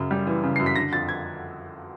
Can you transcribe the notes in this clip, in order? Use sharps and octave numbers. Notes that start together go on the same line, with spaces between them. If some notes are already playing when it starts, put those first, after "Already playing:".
Already playing: F#2 C#3
G3
E3
C#3
F#2 C7
B6
D3 A#6
F2 A6
G#6